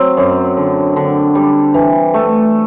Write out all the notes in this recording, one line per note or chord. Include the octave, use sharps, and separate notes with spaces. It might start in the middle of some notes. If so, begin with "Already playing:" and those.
Already playing: F#3 C4
F#2
D3
D3
G3
E3
A3